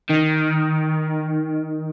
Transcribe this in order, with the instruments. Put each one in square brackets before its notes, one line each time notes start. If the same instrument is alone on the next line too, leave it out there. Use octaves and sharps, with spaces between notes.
[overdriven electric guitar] D#3